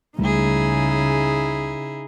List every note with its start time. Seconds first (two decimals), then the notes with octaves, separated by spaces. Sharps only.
0.18 C#2 C#3 G3 A3 D#4 E4 G#4